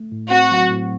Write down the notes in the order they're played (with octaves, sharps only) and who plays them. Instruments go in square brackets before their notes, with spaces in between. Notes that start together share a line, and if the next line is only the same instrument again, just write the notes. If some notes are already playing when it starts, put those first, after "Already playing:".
Already playing: [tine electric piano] A3
A2
[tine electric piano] C4 [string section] F#4
[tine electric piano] F#3
A2